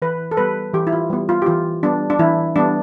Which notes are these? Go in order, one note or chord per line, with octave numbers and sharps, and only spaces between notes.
E3 B4
A4
G3 B3 B4
E3 G4
E4
F4
G3 B3
F4
G4
E3 F4
G3 B3 D4
D4
E3 E4
G3 B3 D4